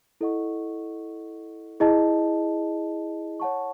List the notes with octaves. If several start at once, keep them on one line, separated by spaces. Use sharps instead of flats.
E4 A4 D#5 F#5 C#6
E4 G#4 D#5 A5
C#5 F#5 A5 C#6